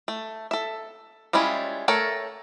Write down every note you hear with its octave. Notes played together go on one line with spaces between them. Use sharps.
A3
A4 E5
G3 G#3 C#4 E4 F4
A3 A4 A#4 C#5